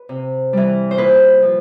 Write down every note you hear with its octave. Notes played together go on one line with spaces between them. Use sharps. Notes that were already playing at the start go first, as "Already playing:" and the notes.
Already playing: B4
C3
E3 G3
C5
A#2 B4
F3